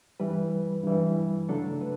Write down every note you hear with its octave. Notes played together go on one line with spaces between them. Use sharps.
G2 E3 G3 B4
G2 E3 G3
C#3 F#3 A3 D4 A4
B4